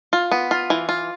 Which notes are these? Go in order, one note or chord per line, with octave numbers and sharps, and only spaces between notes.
F4
B3
F4
E3
F4